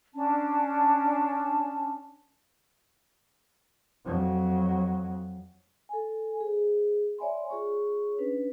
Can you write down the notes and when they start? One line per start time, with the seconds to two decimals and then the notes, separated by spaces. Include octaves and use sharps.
0.14 C#4 D4 A5
4.06 F2 F#3
5.89 A4 G#5
6.41 G#4 C5
7.18 C#5 D5 E5 G#5 B5 C6
7.50 F4 G#4 C#5 C#6
8.18 C#4 D4 B4